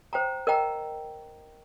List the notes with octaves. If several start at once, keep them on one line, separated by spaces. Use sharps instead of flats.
C5 G5 A#5
A#4 D#5 G5 A#5